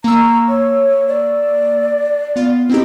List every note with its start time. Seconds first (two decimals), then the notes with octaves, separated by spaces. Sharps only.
0.04 A#3 A#5 C#6 E6
0.49 C#5
1.08 D5
2.36 B3 F4
2.70 C4 D#4 E4 G4